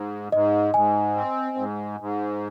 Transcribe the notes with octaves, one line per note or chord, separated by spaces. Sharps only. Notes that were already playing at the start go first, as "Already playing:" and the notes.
Already playing: G#2
G#2 D#5
G#2 G#5
C4
G#2
G#2